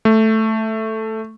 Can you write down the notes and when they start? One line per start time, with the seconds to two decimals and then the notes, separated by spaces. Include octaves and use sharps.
0.05 A3